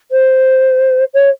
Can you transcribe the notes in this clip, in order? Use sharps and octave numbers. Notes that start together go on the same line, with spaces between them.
C5
C#5